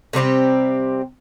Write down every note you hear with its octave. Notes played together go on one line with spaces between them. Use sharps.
C3 G3 C4 G4